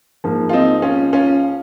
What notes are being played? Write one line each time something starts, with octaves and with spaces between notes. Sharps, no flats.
G#2 F3 A#3
F4
C4 D#4
C#4 F4
C#4 F4